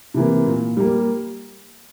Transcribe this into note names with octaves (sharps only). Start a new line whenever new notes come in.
C3 E3 A#3
A#2
G3 A#3